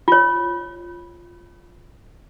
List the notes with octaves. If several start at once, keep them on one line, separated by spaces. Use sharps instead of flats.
F4 C#5